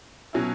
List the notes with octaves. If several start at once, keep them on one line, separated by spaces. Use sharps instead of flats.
B2 F#3 C#4 E4